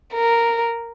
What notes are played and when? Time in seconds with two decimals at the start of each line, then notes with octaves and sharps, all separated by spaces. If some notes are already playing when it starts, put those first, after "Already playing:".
0.14 A#4